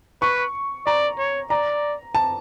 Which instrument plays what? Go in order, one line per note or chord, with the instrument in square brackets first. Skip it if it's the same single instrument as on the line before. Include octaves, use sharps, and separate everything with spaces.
[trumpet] B4 [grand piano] C#6
[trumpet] D5 [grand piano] A#5
[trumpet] C#5
[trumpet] D5 [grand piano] A#5
[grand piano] A5